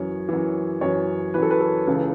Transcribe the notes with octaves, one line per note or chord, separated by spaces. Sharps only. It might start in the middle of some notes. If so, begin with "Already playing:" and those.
Already playing: F#2 E3 C#5
F#2 E3
F#2 E3 C#5
F#2 E3 B4
A4
B4
A4
C#2 C#3 E3